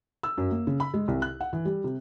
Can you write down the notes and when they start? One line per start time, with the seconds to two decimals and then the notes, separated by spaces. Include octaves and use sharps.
0.23 E6
0.38 F#2
0.51 A#3
0.67 C#3
0.80 B5
0.94 G#3
1.08 C2
1.22 F#6
1.40 F#5
1.53 E3
1.65 G3
1.84 C3